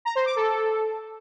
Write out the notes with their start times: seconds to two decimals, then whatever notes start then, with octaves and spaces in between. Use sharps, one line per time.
0.05 A#5
0.15 C5
0.26 D6
0.36 A4